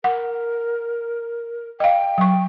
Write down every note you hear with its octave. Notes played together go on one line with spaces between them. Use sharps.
A#4 F#5
D#5 F5 G5
F#3 C#6